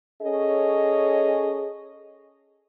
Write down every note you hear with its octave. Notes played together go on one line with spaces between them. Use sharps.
C#4 G#4 A4 C#5 D#5